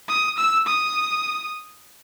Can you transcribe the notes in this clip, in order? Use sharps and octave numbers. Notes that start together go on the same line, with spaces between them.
D#6
E6
D#6